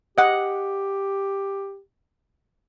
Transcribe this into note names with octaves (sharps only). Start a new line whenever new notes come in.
G4 D#5 F#5